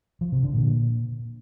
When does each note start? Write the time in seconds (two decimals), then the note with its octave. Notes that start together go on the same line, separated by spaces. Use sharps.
0.21 F3
0.32 C3
0.43 D3
0.54 A#2